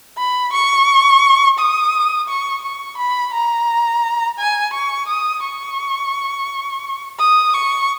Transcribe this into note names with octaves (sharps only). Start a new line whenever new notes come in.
B5
C#6
D#6
C#6
C#6
B5
A#5
G#5
C#6
D#6
C#6
D#6
C#6